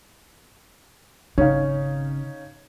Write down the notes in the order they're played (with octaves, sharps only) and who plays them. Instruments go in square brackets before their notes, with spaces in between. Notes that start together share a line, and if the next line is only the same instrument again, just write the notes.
[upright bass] G#1 C#3 [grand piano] C#4 D#4 F5